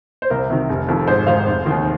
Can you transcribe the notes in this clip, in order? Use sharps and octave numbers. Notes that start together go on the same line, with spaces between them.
C5
C2 A#4
C3 D#3
F1
F2 D#3
G#1 C5
G#2 D#3 C5 F5
F1
D#2 D#3